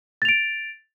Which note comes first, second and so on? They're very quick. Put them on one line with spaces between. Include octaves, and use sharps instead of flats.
A6 F7 D7